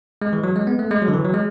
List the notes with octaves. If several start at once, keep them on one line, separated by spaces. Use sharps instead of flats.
G#3
E3
F#3
G#3
B3
A3
G#3
F#3
D3
E3
F#3
G#3